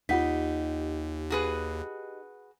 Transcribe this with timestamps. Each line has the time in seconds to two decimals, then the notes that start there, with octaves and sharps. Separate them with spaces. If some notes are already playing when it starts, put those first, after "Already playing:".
0.09 D#2 D#4 F4 G4 F#5 B6
1.30 F#4 G#4 B4